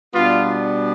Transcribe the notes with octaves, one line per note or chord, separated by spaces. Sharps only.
B2 G3 B3 D4 F4